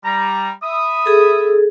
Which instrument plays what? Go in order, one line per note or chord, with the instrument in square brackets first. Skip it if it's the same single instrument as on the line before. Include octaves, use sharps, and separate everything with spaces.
[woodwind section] G3 A#5
E5 B5 D#6
[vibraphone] G#4 A4